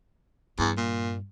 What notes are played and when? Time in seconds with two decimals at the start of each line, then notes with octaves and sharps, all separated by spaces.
0.59 E2 G2
0.77 A#2